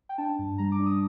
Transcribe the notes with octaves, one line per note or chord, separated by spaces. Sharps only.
G5
D4 A5
G2
G3 A#5
D6
D4
D#6